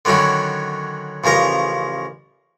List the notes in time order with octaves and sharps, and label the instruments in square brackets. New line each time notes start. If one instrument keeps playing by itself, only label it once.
[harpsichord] D3 D#3 F#3 C#4 E4
A1 C#3 F3 A#4 A#5